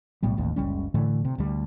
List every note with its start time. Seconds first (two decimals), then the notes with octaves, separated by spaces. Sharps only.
0.23 B1 A2 G3 B3
0.37 D#1 A1 D#2
0.56 F#1 C#2 G3 C#4
0.94 A2 D3 E3 A3
1.25 C3
1.38 D2 G3